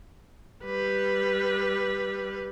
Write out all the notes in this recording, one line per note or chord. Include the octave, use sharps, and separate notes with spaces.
G3 B4